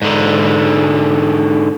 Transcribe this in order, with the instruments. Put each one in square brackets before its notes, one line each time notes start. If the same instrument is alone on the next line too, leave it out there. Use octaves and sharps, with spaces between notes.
[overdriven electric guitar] G#2 D3